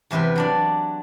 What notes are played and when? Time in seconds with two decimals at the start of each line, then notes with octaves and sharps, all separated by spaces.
0.11 E2 C3 G4 B4 C6
0.36 F#3 D4 D5